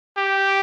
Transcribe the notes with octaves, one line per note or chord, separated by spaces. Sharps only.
G4